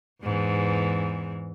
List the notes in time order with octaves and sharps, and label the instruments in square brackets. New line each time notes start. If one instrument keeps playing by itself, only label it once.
[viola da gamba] E2 G#2 E3